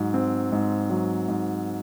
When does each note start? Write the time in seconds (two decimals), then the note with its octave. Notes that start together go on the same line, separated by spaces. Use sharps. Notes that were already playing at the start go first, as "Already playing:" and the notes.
Already playing: G#2 F#3
0.14 C4
0.52 G#2
0.90 F#3
1.28 G#2